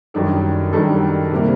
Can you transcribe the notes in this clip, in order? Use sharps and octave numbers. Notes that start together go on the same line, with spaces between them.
F#2 D#3 G3 D4 A4
F#2 D#3 G3 D4 A4
C3 G3 A#3